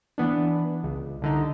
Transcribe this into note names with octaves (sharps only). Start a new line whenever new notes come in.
E3 B3 D4
C#2
C2 D3 D#4